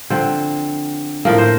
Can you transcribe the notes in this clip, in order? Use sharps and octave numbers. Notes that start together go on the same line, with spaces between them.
D3 F3 C4 C5
A2 F3 A#3 A#4
C5